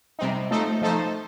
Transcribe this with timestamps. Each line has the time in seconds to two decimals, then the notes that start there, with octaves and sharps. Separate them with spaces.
0.19 C3 G3 C4 D#4
0.51 F3 A3 D#4 A4 C5
0.82 F3 A3 D#4 A4 C5